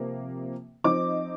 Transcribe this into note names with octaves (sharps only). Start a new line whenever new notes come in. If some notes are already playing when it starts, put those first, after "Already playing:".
Already playing: C3 F3 A#3
F3 C4 D#4 D6